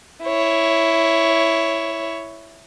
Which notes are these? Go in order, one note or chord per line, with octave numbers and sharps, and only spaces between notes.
E4 C#5